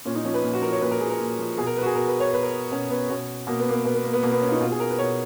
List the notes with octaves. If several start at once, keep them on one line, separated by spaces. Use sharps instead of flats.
A#2 C#4
D#4
F3 C#4
B4
A#2
F#4
F3 A#4
C#5
A#2 B4
A#4
F3 G#4
A#4
A#2
F3
B2 G#4
A#4
B4
F#4
G#4
B2 A#4
B4
C#5
B2 B4
A#4
B2 C#4
B3
B2 C#4
B2 A#3
B3
A#3
B3
B2 B3
B3
A#3
B3
B2 A#3
B3
C#4
F4
D#4
B2 F4
G#4
A#4
B4
B2 C#5